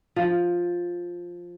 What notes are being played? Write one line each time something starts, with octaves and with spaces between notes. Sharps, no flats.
F3